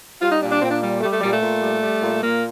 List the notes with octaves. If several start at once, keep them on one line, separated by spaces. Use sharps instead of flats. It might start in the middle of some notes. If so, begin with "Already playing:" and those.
G3 F4
D#4
A#2 D4
D4
A#2 C4
D4
G3
G3 A3
A3
A#2 G3
A3
A#2
G3
G3
A#2
A#2 A#3